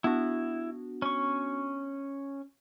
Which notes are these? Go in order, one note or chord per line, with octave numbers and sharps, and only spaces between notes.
B3 D4 E4 F#4
C#4 C#6